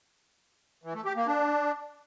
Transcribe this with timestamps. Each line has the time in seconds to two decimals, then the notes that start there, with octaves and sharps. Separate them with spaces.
0.84 E3
0.94 A3
1.05 G4
1.16 A#3
1.27 D4